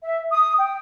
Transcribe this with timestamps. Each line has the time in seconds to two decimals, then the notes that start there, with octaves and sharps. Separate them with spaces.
0.02 E5
0.31 D#6
0.57 G5